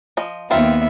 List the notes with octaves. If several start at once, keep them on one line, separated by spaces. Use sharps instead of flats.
F3 D#5
D#2 D#3 B3 C4 F4 E5